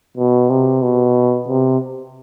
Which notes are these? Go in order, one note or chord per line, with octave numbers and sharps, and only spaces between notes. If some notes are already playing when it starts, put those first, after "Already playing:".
B2
C3
B2
C3